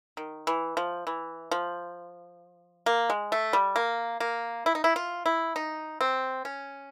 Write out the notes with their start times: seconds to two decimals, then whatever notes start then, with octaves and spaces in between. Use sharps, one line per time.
0.17 D#3
0.47 E3
0.77 F3
1.07 E3
1.51 F3
2.86 A#3
3.10 G#3
3.32 A3
3.53 G3
3.76 A#3
4.20 A#3
4.66 E4
4.75 D#4
4.84 E4
4.96 F4
5.26 E4
5.56 D#4
6.01 C4
6.45 C#4